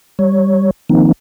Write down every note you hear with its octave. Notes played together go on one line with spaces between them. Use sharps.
G3 C#5
D#3 F3 A#3 C4 D#4